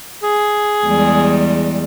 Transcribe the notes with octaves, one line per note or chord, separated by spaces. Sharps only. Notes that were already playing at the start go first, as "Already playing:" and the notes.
G#4
E2 G3 G#3